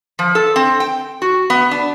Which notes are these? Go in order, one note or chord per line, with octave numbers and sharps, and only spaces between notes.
F3
A4
C4
G5
F#4
B3
D4